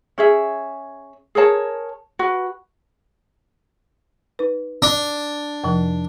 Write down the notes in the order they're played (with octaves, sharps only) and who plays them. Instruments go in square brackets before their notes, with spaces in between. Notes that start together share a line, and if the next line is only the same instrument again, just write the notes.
[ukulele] C#4 G#4 E5
G#4 A#4 C#5 A5
F#4 B4
[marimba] D#4 B4
[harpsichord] D4
[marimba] F2 C3 F3